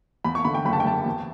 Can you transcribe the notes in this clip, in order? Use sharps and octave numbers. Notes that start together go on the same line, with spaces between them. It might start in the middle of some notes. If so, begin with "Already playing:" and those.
E2 B5
C#6
D3 B5
G5
F#1 B5
A5
G5
F#1 A5
E2